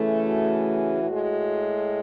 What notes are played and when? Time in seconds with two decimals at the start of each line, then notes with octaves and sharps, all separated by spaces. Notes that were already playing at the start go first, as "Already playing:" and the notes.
Already playing: C#3 E3 A3
0.26 F#4
1.04 A2
1.09 G#3